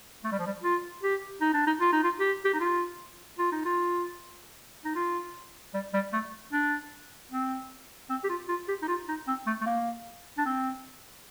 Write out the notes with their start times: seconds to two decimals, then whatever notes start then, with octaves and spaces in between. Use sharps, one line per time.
0.24 A3
0.32 G3
0.39 F3
0.46 G3
0.63 F4
1.03 G4
1.41 D#4
1.54 D4
1.67 D#4
1.81 F4
1.93 D#4
2.04 F4
2.20 G4
2.45 G4
2.54 D#4
2.60 F4
3.39 F4
3.52 D#4
3.65 F4
4.85 D#4
4.95 F4
5.74 G3
5.94 G3
6.13 A3
6.53 D4
7.31 C4
8.10 C4
8.24 G4
8.29 F4
8.49 F4
8.68 G4
8.82 D#4
8.88 F4
9.08 D#4
9.28 C4
9.47 A3
9.61 A3
9.66 A#3
10.38 D4
10.46 C4